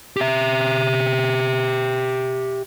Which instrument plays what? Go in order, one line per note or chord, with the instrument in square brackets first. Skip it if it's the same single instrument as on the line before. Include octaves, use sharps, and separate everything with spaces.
[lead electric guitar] G4 E5